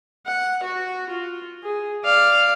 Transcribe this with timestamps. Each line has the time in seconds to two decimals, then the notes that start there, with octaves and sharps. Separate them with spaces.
0.27 F#5
0.63 F#4
1.09 F4
1.64 G#4
2.05 D5 F5